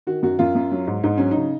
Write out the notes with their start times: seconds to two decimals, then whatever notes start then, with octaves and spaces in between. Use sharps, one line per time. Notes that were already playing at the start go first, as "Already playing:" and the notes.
0.07 D#3 F#4
0.23 F#2 F#4
0.39 F#2 F4
0.55 F#2
0.72 F#3
0.87 G#2
1.04 G#2 D#4
1.17 F#3 C#4
1.31 D#4
1.36 C#3